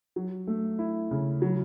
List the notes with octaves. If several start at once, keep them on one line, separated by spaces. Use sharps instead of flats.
F#3
A3
E4
C#3
F#3